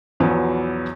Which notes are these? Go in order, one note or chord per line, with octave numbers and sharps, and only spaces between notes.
B1 E2 F3 F#3 B3